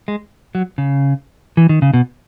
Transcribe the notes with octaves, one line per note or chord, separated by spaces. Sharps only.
G#3
F#3
C#3
E3
D#3
C#3
B2